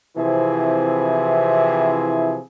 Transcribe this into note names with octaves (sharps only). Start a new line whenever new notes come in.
C3 E3 F3 C4 E4 G#4